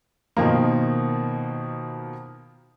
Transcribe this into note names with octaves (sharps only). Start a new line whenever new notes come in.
B2 D#3 F3 A#3